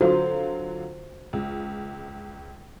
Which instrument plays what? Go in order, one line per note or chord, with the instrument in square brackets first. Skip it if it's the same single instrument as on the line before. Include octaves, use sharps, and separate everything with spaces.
[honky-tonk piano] D3 F#3 F4 [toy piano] F#4 [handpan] C5
[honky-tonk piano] C#2